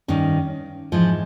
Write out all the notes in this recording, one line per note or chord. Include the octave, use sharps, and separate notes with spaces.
G2 D#3 C#4
G#2 E3 F3